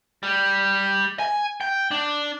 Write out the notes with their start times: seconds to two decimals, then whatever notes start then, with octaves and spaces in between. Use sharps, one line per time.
0.23 G3
1.19 G#5
1.61 G5
1.91 D4